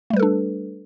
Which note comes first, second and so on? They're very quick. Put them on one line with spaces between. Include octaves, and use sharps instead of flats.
A3 G3 B4 A4 D4